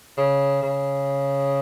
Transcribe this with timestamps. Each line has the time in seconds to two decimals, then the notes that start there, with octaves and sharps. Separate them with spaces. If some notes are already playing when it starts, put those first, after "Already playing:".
0.17 C#3
0.62 C#3